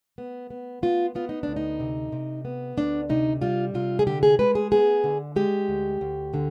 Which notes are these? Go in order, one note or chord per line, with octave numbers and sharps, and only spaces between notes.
B3
B3
B3 F4
B3 F4
D#4
D2 D4
D#4
C3
C3
B3
D2 D4
C3 D#4
G3 F4
C3 F4
G#4
D3 G4
G#4
G#3 B4
G#4
B3 G#4
D3
G#3 G4
D2
D2
D3